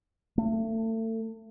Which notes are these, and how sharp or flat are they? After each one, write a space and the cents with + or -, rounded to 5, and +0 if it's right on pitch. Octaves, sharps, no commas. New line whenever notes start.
A3 +30